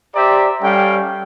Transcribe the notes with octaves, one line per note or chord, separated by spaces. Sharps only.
G4 C5 D5 E5 A#5
G3 C#4 A4 F5 G5